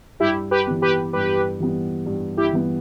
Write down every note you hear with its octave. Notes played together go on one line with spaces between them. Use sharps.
G2 E4 G4
G4 B4
E3 G3 B3
G4 B4
G2 G4 B4
E3 G3 B3
G2
E4 G4
E3 G3 B3